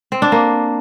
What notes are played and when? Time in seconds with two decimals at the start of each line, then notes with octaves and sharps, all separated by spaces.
0.12 C4
0.22 D4
0.32 A#3